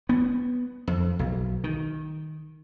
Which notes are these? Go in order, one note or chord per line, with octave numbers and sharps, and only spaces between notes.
B3
F2
B1
D#3